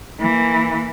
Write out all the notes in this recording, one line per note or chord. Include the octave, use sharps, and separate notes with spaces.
E3 A#3